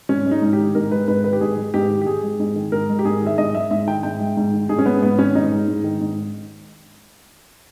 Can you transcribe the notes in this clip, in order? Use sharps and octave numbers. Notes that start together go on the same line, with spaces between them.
G#2 C#4
G#3
D#4
G#2
G4
D#3
G#2 A#4
G#3 B4
G#2 B4
D#3 B4
G4
G#2 G#4
G#3
G#2 G4
D#3
G4
G#2 G#4
G#3
G#2
D#3
G#2 A#4
G#3
G4
G#2 G#4
D#3 E5
G#2 D#5
G#3 E5
G#2 E5
D#3 G5
G#2 G5
G#3
G#2
D#3
G#2 G#4
C#4
G#3 B3
G#2 B3
D#3 C#4
G#2 D#4
G#3
G#2
D#3
G#2